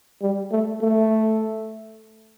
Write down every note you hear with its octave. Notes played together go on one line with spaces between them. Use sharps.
G3
A3
A3